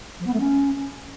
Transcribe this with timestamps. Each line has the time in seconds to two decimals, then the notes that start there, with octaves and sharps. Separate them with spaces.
0.20 F3
0.26 B3
0.33 A3
0.40 C#4